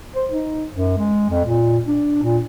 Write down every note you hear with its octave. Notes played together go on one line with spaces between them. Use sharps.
C5
D#4
F#2
G#3
F2
A#2
D4
A#2